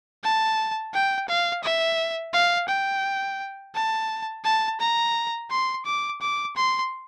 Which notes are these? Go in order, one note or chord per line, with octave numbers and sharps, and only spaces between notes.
A5
G5
F5
E5
F5
G5
A5
A5
A#5
C6
D6
D6
C6